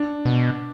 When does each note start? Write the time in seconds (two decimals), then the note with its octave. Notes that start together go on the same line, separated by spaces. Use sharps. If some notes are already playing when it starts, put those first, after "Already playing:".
Already playing: D4
0.25 B2